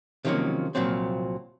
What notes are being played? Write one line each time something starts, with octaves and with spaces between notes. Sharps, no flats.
C3 D#3 F3 F#3 A#3 C#4
C2 A#2 F3 F#3 C4